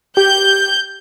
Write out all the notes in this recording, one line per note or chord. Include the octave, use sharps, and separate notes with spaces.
G4 G6